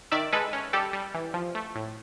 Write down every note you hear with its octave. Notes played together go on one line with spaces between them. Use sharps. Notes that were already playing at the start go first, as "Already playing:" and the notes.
D#3 D5 E5
G#3 A4 B4
C#4
G3 G4 A4
G3
E3
F3
A3
A2